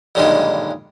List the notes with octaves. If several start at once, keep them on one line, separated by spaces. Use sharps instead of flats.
B1 G2 A#2 D3 D#3 G#3